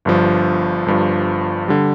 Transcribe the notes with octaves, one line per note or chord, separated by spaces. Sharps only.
G1 G2 F3
G1 G2 F3
D3 G3